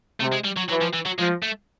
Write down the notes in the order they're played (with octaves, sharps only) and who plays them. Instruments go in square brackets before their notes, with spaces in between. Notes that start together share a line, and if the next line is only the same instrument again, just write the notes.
[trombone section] C3 [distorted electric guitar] A3
[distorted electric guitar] G#3
G3
F#3
[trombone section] E3 [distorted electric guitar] F#3
[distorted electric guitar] F3
E3
F#3
[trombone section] F3 [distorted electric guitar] G#3
[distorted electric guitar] A3